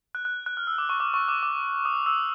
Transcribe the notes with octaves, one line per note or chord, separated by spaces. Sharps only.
F#6
F#6
F#6
F6
E6
D6
C#6
D6
C#6
D6
D6
D#6
E6